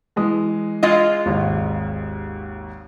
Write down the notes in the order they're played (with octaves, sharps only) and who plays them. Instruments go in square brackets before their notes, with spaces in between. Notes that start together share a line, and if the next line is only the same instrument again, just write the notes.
[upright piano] E3 G#3 D#6
[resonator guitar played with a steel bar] G#3 F4 D#5
[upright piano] G#1 D#2